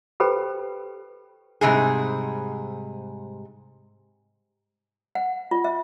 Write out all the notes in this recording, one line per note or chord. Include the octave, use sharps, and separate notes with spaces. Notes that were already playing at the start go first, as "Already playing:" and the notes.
G4 A4 B4 C5 G5 B5
G#2 C3 G3 G#4
F#5
F4
E5